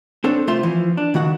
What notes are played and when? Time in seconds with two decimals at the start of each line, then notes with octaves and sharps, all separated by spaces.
0.24 C4 D4 A4 C#5
0.47 C2 A3 F4 C5 E5 C6
0.63 E3 F3
0.97 D4
1.14 C#2 D#3 F#4 F#5